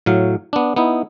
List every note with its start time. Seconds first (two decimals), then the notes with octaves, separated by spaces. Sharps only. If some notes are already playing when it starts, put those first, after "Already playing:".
0.06 A2 F#3 F5
0.53 B3 D4
0.76 B3 D#4 E4